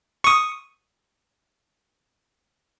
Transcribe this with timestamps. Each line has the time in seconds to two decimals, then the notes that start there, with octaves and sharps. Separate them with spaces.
0.24 C#6 D#6